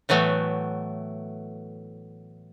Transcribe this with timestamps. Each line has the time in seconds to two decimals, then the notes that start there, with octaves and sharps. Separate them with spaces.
0.09 A2 E3 F#3 A3 B3